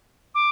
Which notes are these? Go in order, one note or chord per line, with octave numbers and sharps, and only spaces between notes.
D6